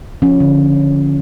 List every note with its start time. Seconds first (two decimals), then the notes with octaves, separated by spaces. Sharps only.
0.22 F3 C#4
0.40 D3